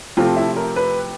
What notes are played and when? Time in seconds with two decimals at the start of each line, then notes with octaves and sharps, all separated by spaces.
0.17 C3 F3 A3 C4 F4
0.36 E4
0.56 A#4
0.76 B4